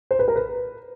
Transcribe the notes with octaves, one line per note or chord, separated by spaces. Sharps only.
C5
B4
A#4
B4